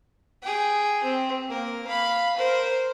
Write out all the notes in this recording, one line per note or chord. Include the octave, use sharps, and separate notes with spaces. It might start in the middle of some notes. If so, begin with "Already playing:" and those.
G#4 G5
C4
A#3 A#4
F5 B5
A#4 C5